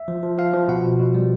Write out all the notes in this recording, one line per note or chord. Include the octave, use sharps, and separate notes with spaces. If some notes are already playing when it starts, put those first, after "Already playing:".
Already playing: E5
F3
F3
F3 F5
F3
B2 F#5
B2
B2
G3